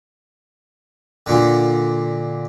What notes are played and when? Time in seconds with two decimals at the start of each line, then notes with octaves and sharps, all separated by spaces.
1.26 A#2 D3